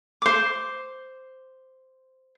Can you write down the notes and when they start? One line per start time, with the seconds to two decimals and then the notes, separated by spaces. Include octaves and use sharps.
0.22 C5 D6